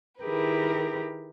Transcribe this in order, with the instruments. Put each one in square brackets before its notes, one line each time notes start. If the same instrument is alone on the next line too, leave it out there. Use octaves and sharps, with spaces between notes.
[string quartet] D#3 E4 G4 G#4 A#4 B4